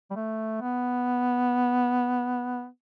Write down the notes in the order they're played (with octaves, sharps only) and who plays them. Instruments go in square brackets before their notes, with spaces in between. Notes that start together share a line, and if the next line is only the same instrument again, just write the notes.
[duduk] G3
A3
B3